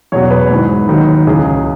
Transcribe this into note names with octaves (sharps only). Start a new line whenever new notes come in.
E2 B2 F#3 C#5
B4
G#2 E3
D#2 D#3 F#3
F#4
C#2 C#3 E3 G#4